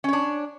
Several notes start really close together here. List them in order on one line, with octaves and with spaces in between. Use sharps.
C#4 C#5 D4